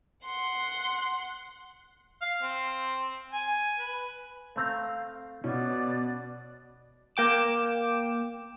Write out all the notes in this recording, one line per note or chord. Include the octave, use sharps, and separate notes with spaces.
F#5 C6
F5
C4
G#5
B4
A3 C4 F5 A#5
B2 B3 C#4 D5
A#3 G5 D6 E7